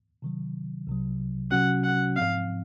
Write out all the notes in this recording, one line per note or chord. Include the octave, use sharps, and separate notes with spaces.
C3 D#3 F#3
C2 C3 F#3
C3 F#3 C#4 F#4 F#5
F#5
G#2 F3 C4 F5